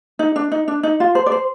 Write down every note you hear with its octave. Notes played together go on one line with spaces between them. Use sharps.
D#4
D4
D#4
D4
D#4
F4
C5
D5
C5